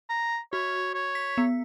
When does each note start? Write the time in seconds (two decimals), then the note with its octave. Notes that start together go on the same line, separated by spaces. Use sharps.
0.10 A#5
0.53 F#4 C#5
0.94 C#5
1.15 B6
1.38 B3